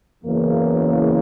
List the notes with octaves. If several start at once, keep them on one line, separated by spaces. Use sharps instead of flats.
F#1 E2 C#3 E3 A#3